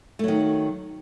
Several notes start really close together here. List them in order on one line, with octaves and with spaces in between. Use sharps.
A3 F#3 D#3